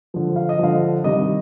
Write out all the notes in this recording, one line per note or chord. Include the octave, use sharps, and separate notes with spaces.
D3 F3
F5
D#5
D3 F3 F5
C3 D#3 G3 D#5